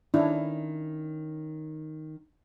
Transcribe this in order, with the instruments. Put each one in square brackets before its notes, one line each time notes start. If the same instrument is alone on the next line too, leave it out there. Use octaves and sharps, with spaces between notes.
[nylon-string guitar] D#3 C#4 [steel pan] D4 E4